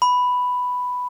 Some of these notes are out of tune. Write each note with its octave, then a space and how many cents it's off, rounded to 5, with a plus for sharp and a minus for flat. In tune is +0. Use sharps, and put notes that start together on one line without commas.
B5 +5